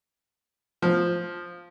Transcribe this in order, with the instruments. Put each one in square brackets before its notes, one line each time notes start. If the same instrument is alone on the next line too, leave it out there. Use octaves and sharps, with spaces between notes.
[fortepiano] F3